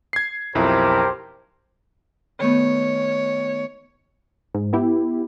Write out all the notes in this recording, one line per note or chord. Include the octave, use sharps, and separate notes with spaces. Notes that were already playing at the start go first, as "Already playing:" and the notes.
G#6 C7
B1 F2 E4 G4 A#4 C5
D#3 A3 B3 C#5
G#2
B3 E4 G4